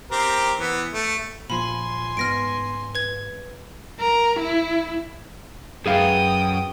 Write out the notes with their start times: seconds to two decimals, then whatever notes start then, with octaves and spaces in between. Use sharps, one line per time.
0.11 C4 G4 A#4
0.58 E3 B3
0.94 A3
1.50 A#2 F3 G#5 B5 C6
2.17 G#2 B3 F6 A#6 D7
2.95 B4 G#6
4.00 A#4
4.39 E4
5.86 F#2 G#4 B4 F5 G5 D#6